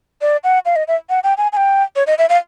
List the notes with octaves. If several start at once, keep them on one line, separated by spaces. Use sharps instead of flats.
D5
F#5
F5
D#5
E5
F#5
G5
G#5
G#5
G5
C#5
D#5
E5
F5